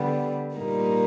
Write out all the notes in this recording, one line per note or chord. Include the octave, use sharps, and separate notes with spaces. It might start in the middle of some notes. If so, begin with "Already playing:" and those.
Already playing: D3 G3 B3
A#2 G3 A#3 D#4